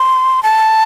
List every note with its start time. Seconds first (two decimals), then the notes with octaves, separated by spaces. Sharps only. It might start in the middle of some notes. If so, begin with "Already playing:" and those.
Already playing: C6
0.43 A5